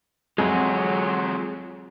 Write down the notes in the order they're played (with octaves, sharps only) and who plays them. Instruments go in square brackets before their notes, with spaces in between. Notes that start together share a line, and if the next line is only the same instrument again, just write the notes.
[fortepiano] F2 [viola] F#3 [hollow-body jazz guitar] G#3 [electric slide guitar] F4 C#5 F#5